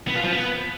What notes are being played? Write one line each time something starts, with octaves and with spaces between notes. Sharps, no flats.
B3
F4
F3
B3